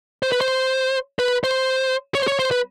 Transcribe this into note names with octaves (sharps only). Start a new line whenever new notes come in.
C5
B4
C5
B4
C5
C#5
C5
C#5
C5
B4